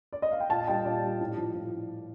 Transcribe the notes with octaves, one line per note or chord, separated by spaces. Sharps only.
D5
D#5
F5
G5
A#2 F5 A5
G3 D#5 G5
A#2 D5 F5
G3
A2
F3
A2